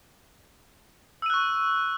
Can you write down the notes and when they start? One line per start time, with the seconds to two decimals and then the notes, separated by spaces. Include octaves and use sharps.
1.22 E6
1.26 D#7
1.30 F#6
1.34 C#6